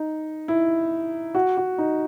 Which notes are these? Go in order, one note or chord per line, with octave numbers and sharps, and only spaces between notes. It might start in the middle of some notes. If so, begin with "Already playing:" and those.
Already playing: D#4
E4
F#4
F#4
D#4